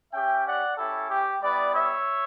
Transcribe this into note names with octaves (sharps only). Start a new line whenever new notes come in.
C#4 G4 E5 G5
D5 F#5
C#4 E4 G4 A4
G4
G3 B3 E4 B4 D5
C#5 E5